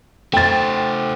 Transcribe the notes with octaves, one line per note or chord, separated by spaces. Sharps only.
A3 C5 G5 A6